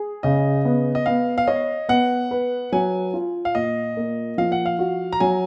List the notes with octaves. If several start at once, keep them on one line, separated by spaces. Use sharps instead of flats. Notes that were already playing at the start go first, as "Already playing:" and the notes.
Already playing: G#4
C#3 D#5
B3
D#5
B3 F5
F5
C#5 D#5
B3 F#5
B4
F#3 G#5
F4
F5
A#2 D#5
A#3
F3 F5
F#5
F5
F#4
A#5
F#3 G#5